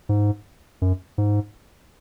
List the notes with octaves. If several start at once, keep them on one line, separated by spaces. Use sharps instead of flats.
G#2
F#2
G#2